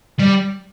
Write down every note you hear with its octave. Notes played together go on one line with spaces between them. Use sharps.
G3